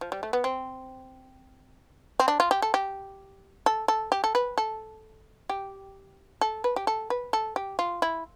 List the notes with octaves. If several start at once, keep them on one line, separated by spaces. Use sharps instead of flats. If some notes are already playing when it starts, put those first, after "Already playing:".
F3
G3
A3
B3
C4
C4
D4
F4
G4
A4
G4
A4
A4
G4
A4
B4
A4
G4
A4
B4
G4
A4
B4
A4
G4
F4
E4